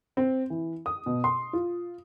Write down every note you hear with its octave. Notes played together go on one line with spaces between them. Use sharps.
C4
E3
D#6
B2
C6
F4